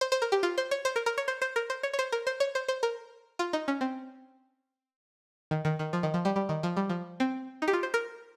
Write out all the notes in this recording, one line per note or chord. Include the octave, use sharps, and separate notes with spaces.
C5
C5
A#4
G4
F4
C5
C#5
C5
A#4
A#4
C#5
C5
C5
A#4
C5
C#5
C#5
C5
A#4
C5
C#5
C5
C5
A#4
F4
D#4
C#4
C4
D#3
D#3
D#3
F3
D#3
F3
G3
G3
D#3
F3
G3
F3
C4
D#4
G4
F4
C5
A#4